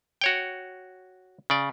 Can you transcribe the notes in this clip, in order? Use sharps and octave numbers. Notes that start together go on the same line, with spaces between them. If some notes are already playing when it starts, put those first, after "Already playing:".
F#4 C#5 G5
C#3 D5